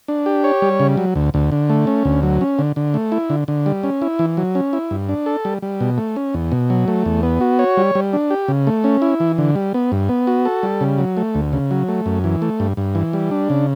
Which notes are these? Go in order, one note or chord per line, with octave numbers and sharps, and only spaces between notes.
D4
G4
C#5
G3
C#3
F#3
D2
D2
D3
A3
C#4
D2
F#3
C#4
D3
D3
A3
E4
D3
D3
G3
C#4
E4
E3
F#3
C#4
E4
G2
D4
A4
G3
G3
B2
A3
C#4
E2
B2
F#3
A3
E2
B3
F#4
C#5
G3
G3
D4
G4
C#3
A3
C#4
E4
E3
D3
G3
B3
G2
B3
F#4
A4
G3
C#3
F#3
A3
D2
C#3
F#3
A3
F#2
E3
A3
G2
G2
E3
G3
D4
C#3